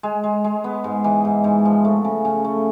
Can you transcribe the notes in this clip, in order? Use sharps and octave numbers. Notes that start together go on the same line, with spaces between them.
G#3
G#3
G#3
B3
G#2
E3
G#2
G#2
F3
A3
C#3
C#3
A3